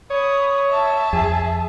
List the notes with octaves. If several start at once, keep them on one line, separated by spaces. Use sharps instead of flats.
C#5 B5 D#6
E5 A5
F2 G#4